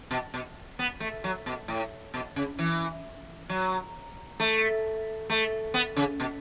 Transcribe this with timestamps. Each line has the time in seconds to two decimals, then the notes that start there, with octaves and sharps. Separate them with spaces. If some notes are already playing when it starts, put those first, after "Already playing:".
0.11 B2
0.34 B2
0.79 B3
1.00 A3
1.24 F#3
1.46 B2
1.68 A2
2.14 B2
2.36 C#3
2.59 E3
3.49 F#3
4.40 A3
5.30 A3
5.74 B3
5.96 C#3
6.20 B2